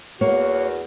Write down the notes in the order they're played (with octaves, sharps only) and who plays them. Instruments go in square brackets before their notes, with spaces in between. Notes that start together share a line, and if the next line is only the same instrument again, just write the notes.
[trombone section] E2 F#4 [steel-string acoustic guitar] A#3 C#5